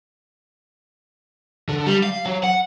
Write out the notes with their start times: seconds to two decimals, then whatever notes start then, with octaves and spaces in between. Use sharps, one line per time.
1.69 D3
1.86 G3
2.03 F5
2.26 F#3
2.43 F#5